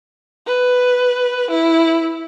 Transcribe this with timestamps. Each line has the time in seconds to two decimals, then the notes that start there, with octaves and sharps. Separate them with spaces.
0.47 B4
1.51 E4